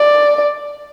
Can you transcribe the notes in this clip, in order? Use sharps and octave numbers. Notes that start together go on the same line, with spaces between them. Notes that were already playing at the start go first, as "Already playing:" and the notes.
Already playing: D5